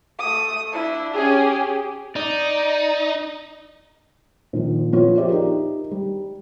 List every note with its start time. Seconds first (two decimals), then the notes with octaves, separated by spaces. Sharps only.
0.19 A3 D#6
0.73 D4 E4
1.15 C#4 G4 G#4
2.16 D#4 D5
4.53 A#2 D#3 F3
4.92 F3 B3 E4 F4 C#5
5.17 F4 G4 G#4 C5 D5 E5
5.29 D#4 G4 A#4
5.91 G3